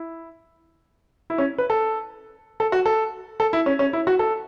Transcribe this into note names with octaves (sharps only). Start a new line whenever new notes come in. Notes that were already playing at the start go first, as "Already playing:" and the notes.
Already playing: E4
E4
C#4
B4
A4
A4
F#4
A4
A4
E4
C#4
C#4
E4
F#4
A4